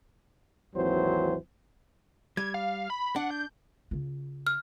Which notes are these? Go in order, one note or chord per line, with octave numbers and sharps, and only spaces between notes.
G#1 D#2 E3 F#3 C4 C5
G3 G#6
F5
B5
D4 F#5
G6
C#3 F4
F6